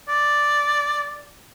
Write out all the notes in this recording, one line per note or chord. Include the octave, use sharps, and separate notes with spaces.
D5